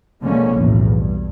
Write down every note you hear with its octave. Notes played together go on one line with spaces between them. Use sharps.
B2 D3 F3 G#3 A#3 C#4
B1 E2 A2 F3
G2